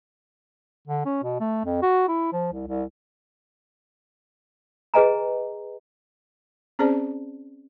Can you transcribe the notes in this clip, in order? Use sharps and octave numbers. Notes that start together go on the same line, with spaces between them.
D3
C#4
B2
A3
F2
F#4
E4
F3
C2
C2
G#4 B4 D#5 G#5 A#5
C4 C#4 G#4 C5 D5 A5